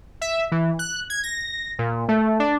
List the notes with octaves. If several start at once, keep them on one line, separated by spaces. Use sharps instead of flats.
E5
E3
F#6
G#6
A#6
A#2
A3
D4